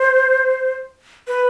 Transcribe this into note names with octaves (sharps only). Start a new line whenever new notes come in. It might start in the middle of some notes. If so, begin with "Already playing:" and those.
Already playing: C5
B4